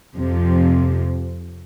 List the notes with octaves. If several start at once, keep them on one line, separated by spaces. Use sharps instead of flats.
F2 C3 F3